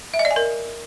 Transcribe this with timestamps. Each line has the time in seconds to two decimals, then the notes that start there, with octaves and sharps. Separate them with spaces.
0.14 E5
0.19 D#5
0.25 D5
0.31 G#5
0.36 A#4